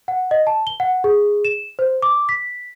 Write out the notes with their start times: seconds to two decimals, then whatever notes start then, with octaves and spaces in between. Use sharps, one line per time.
0.08 F#5
0.31 D#5
0.47 A5
0.67 G7
0.80 F#5
1.04 G#4
1.45 E7
1.79 C5
2.02 D6
2.29 B6